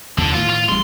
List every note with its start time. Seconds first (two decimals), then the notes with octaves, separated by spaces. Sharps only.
0.18 D#2 D3 F3
0.34 A2 D#3 F3 F4
0.50 F4
0.69 A1 G3 G#3 C6